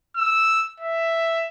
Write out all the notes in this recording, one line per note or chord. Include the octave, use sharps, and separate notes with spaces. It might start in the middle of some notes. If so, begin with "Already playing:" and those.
E6
E5